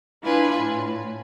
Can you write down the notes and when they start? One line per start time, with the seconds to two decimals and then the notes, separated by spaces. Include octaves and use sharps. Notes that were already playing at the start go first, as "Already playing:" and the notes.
0.23 D4 E4 F4 B4 G#5
0.59 A2